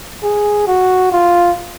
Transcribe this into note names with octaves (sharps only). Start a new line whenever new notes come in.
G#4
F#4
F4